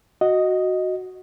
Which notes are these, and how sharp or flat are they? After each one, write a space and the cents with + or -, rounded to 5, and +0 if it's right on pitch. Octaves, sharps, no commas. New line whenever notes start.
F#4 +0 D#5 +0